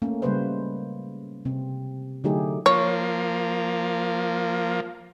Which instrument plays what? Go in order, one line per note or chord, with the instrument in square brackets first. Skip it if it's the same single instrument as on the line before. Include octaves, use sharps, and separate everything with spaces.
[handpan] A3 A#3 C#4
C#3 G3 G#3 A#3 B4 C5
C3 C4
D3 F#3 A3 D#4 G4 G#4
[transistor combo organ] F3 A#3 [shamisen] C#5